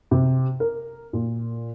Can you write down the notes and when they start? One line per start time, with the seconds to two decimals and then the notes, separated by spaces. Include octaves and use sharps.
0.11 C3
0.60 A#4
1.13 A#2